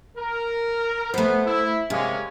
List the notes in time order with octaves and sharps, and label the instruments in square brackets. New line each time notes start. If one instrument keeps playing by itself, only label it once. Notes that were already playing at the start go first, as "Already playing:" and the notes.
[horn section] A#4
[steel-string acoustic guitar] A3 C5 [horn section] B3
[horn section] E4
[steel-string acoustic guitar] C3 [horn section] G#3 A#3 C#4